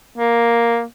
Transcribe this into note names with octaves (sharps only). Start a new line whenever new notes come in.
A#3